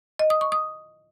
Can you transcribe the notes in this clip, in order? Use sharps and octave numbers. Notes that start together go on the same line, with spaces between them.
D#5
D#6
C#6
D#6